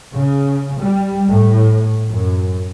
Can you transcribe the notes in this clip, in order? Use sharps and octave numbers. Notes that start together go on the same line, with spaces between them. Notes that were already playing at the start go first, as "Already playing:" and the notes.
C#3
G3
A2
F#2